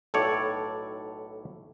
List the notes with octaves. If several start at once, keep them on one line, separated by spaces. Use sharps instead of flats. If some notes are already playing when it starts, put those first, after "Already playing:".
B1 A2 A4 C#5 D5